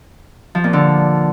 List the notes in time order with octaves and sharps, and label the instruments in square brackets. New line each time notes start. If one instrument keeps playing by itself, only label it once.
[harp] F3
A#2
D3